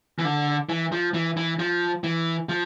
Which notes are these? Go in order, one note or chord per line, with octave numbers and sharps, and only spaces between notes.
E3
D3
E3
F3
E3
E3
F3
E3
F3